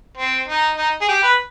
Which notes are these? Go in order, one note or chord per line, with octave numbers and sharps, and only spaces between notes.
C4
D#4
D#4
G#4
G4
B4